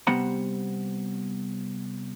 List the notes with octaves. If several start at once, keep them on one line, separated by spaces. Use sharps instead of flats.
C3 G3 B3 C5 F#5 A#5